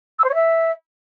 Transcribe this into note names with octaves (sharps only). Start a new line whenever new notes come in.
E6
C5
C#5
E5